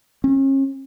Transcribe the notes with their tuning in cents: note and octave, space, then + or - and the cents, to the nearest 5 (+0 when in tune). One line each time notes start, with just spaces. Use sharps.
C#4 -40